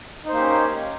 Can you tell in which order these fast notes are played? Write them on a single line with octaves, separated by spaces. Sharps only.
D#4 C5 A#3 G4 C#4